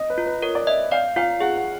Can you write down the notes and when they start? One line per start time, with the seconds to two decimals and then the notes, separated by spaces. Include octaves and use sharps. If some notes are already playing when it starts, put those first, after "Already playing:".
Already playing: D#5
0.10 B4
0.18 F4
0.26 B4
0.42 A#4 C#5
0.55 D5
0.67 D#5 E5
0.91 D5 F5
1.16 F4 F5
1.40 G#4 F#5
1.57 F#5